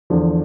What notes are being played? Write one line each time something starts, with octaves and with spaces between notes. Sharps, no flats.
E2 D3 F3